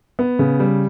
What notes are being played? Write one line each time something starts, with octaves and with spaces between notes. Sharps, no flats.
B3
C#3
G3